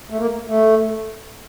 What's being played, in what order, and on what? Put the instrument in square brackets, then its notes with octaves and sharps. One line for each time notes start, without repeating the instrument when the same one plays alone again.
[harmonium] A3
A#3
A3